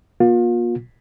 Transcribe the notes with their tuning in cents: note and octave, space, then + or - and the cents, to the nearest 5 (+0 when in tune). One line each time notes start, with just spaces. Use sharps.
A#3 +40 F4 +35